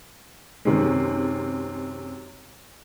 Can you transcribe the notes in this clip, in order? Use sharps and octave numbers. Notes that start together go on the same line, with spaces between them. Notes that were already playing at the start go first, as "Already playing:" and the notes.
F#2 C3 D#3 G#3